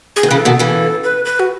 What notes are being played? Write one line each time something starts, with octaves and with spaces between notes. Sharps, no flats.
G#4
D#3
C#3 E3 B4
A4
B2 D#3
C#3 E3
B4
B4
F#4